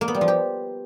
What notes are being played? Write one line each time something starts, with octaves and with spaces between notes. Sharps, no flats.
A#3
B3
G3
F3
G4